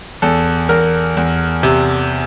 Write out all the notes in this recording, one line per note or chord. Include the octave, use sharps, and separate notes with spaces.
E2 A4
E2 A#4
E2
C3